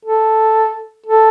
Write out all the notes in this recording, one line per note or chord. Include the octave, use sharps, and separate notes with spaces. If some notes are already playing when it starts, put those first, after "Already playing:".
A4
A4